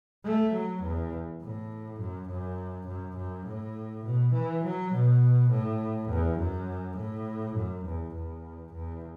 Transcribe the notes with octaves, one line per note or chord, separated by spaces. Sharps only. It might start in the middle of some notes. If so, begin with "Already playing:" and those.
A3
F#3
E2
A2
F#2
F#2
F#2
F#2
A2
B2
E3
F#3
B2
A2
E2
F#2
A2
F#2
E2
E2
E2